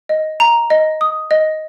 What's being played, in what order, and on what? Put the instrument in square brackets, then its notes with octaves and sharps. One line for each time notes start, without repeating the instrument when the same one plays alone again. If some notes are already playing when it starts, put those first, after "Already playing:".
[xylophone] D#5
A#5
D#5
D#6
D#5